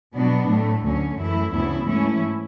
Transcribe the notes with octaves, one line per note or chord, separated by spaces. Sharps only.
B2 F#3 B3 D4
A2 F#3 A3
D2 D3 F#3 C#4
F#2 E3 A3 E4
D2 C#3 E3 B3 E4
G#2 E3 A3 C#4 E4